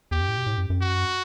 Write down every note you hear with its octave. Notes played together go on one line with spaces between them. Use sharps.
E2 G4
F#2
A2
B2
A2
F#2
F#2
F#4